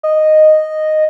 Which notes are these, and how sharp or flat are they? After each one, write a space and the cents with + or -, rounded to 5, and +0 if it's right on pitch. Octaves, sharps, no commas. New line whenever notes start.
D#5 -5